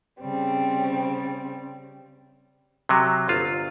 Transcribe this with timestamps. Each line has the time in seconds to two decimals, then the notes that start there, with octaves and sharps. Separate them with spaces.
0.20 C#3 G3 C4
2.89 C3 F#3
3.28 G1 F4 C5